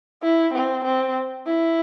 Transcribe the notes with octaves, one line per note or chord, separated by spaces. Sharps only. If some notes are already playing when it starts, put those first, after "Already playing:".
E4
C4
C4
E4